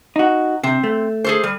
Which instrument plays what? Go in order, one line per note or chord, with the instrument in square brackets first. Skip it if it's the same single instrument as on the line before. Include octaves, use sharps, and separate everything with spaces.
[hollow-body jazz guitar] D#4 F#4
[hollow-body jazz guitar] C3 [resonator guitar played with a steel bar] C4
[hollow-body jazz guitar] A3
[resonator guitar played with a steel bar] G#4 A4 C5
G3